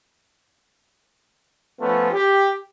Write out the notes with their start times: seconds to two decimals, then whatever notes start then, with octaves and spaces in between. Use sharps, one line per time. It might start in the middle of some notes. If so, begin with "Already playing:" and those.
1.79 F3 A3 B3 C#4 F4
2.12 G4